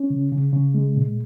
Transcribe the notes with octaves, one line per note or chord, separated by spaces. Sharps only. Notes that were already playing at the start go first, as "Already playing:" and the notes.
Already playing: C#4
C#3
C#3
C#3
G#3
A#2